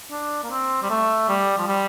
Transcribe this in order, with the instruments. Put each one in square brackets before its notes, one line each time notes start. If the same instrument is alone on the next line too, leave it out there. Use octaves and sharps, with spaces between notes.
[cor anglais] D4
A#3
C4
G3
A3
G3
F3
G3